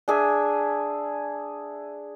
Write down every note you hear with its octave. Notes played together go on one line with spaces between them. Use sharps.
D4 G#4 E5